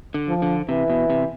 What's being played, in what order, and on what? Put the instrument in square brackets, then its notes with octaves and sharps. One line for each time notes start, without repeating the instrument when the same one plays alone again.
[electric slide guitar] D3
[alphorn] F3
[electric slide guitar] D3
[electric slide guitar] C3 [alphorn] E3
[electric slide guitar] B2
C3